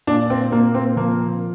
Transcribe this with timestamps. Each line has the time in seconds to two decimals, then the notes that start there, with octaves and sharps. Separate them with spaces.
0.07 A#2 D4
0.30 C4
0.52 A#2 A#3
0.75 C4
0.96 F3 A#3